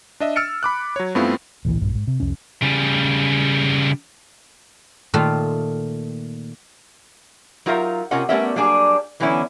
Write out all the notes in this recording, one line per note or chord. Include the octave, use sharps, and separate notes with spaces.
D4 D#5 E5
E6 F6 A6 C#7 D7
B5 D6 F#6
F#3 C#5
G2 A3 B3 C4 E4 F4
A1 D2 A#2 E3
A#1 G2
G#2
C3
C2 F2 C#4
C#3 G3
A#2 D#3 A3 F4
F#3 D#4 F4 A#4 E5 F5
C3 C#4 F4 A#4 D#5 F#5
G3 A3 B3 C#4 A#4 E5
F#3 G3 A#3 D4 G#4
D3 E3 F#3 B3 C#4 E4